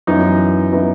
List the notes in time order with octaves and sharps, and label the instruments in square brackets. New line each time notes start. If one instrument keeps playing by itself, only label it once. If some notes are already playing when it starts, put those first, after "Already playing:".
[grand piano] F#2 E3 B3 D#4
E3 B3 D#4